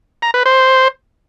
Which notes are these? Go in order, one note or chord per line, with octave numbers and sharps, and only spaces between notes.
A#5
B4
C5